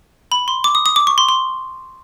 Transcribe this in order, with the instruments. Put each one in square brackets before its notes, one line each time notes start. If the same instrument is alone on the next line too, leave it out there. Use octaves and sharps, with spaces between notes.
[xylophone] B5
C6
D6
D#6
D#6
D6
C#6
C6
C6